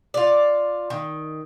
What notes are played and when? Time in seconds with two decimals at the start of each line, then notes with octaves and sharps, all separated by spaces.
0.14 F4 D5
0.90 D#3